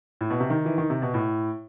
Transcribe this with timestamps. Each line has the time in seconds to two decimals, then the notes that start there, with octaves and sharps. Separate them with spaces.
0.21 A2
0.30 B2
0.40 C3
0.50 D#3
0.65 E3
0.78 D#3
0.90 C3
1.02 B2
1.14 A2